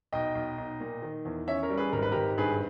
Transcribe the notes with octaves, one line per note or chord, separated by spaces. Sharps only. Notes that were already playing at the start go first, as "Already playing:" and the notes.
B1 D#5 G5
B1
B1
A#2
D#3
E2
C#4 C#5 E5
A#4 C#5
G3
G#4 B4
G#1 A#4
B4
G#1 G4 A#4
G2 G#4 B4